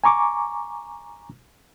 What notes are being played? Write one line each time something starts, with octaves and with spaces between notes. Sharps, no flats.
G#5 A#5 C#6 D6